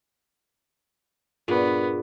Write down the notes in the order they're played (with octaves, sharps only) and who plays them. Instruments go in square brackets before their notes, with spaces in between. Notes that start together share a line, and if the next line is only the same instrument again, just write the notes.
[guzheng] G2 A#2 [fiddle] B3 [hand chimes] F4 G#4